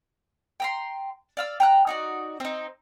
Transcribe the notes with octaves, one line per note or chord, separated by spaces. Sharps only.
G5 A#5 C6
D5 F5 E6
G5 A#5 F#6
D#4 F#4 D5
C4 D#4